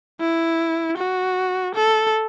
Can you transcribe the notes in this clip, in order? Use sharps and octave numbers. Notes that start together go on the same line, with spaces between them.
E4
F#4
A4